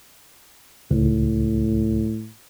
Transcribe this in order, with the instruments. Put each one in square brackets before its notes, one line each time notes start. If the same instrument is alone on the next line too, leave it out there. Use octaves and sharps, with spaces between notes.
[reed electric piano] C#2 [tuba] A2